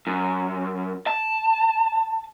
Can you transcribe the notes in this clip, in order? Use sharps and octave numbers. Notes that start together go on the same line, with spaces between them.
F#2
A5